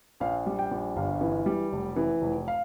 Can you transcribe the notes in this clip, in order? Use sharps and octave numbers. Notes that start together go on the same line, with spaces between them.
A#1 F5
G3
G5
A#1
G1 F5
E3
G3
F1
E3
F1
F5